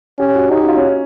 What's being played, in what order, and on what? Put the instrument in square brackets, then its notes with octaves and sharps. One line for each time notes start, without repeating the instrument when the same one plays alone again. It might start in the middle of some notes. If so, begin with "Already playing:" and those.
[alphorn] C#4 [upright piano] G4
[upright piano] F#4
[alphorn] D#4 [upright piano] G4
[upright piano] F#4
F4
C#4